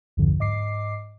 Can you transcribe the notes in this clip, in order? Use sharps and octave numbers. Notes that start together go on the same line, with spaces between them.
B1 E2 G2 D3 F3
G#2 D#5 D6 C7